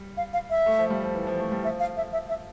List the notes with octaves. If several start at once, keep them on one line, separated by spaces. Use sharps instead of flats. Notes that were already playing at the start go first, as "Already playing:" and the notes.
Already playing: G3
F5
F5
E5
A3
F3
G3
F3
E3
F3
A3
G3
F3 E5
F5
E5
E5
E5